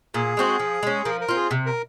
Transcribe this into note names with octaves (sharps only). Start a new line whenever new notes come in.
A#2 G#4
G#3 C4 F#4
F3
G#3 C#4
F3 A#4
A#4
C4 F4
G#4
C3
A#4